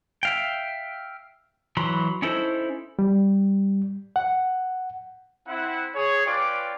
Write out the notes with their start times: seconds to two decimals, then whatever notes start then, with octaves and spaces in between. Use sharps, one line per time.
0.23 E5 F5 G5
1.77 E3 F#3 B5 C6
2.22 C#4 D#4 E4 A4 C5
2.99 G3
4.16 F#5
5.47 C4 E4 F#5
5.95 G#4 C#5
6.27 C#4 F4 B4 D5 G5 D6